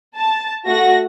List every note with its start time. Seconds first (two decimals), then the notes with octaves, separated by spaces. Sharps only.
0.17 A5
0.66 A3 F#4 A#6